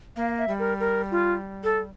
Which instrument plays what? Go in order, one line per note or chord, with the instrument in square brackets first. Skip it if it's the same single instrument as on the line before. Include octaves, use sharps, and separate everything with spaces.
[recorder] A#3 [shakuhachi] F5
[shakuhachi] E5
[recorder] G3
[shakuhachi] A#4
A#4
F4
A4